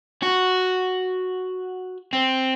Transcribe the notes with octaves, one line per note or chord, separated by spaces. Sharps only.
F#4
C4